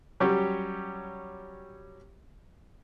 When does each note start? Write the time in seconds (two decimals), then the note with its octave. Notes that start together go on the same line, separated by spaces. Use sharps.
0.20 F#3 G3 C#4 G4 C#5